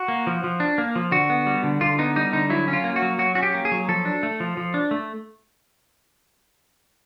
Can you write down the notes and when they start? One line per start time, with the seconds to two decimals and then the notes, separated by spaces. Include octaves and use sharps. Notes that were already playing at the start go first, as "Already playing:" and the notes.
Already playing: F#4
0.08 A#3
0.27 F3
0.44 F3
0.60 D4
0.78 A#3
0.96 F3
1.12 D3 F#4
1.30 B3
1.46 G3
1.63 D3
1.81 D3 F4
1.99 B3 D#4
2.16 G3 D#4
2.33 D3 D#4
2.50 F#3 E4
2.68 C#4
2.73 F4
2.84 A#3
2.96 F#4
3.02 F#3
3.19 F#3 F#4
3.35 C#4 F#4
3.43 G4
3.54 A#3
3.65 G#4
3.72 F#3
3.88 F3 A4
4.05 D4
4.23 A3
4.40 F3
4.57 F3
4.74 D4
4.91 A3